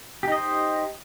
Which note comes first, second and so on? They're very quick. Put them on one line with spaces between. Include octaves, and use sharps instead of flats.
G4 D#4 D#5 C5